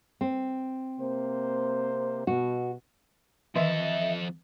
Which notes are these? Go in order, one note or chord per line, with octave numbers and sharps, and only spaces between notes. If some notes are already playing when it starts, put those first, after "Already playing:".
C4
C3 A#3 C5
B2 F#4
F2 D#3 E3 A4 D#5 E5